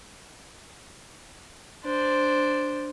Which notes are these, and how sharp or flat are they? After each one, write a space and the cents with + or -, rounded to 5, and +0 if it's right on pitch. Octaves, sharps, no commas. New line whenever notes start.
D4 +0 C5 +0